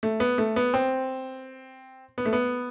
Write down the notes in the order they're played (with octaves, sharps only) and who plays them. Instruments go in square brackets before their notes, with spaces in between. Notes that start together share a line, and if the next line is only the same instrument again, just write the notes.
[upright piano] A3
B3
A3
B3
C4
B3
A3
B3